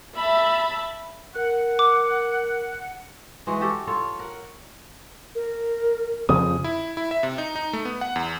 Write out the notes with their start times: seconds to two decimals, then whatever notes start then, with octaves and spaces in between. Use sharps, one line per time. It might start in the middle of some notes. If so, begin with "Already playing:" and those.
0.16 E5 A5 B5
1.35 A#4 F#5
1.79 D6
3.47 E3 G#3 F#4
3.61 F#4 G4 A4
3.87 F4 A4 C#5
4.19 A#4 F#5
5.35 A#4
6.29 F2 C#3 F3 D#6
6.64 E4
6.97 E4
7.11 E5
7.23 C3
7.38 D#4
7.56 D#4
7.73 A3
7.85 B3
8.01 F#5
8.16 E2